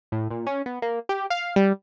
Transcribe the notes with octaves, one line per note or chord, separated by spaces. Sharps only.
A2
A#2
C#4
B3
A#3
G4
F5
G3